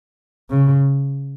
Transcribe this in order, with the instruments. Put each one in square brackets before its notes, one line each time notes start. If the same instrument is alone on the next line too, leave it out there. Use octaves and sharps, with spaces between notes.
[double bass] C#3